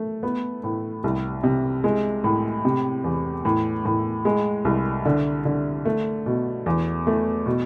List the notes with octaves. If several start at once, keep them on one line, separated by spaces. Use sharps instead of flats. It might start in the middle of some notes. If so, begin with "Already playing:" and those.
Already playing: A3
B3
A2
C2
C3
G#3
A2
C3
E2
A2
A2
G#3
C2
D3
D3
A3
B2
E2
A3
B2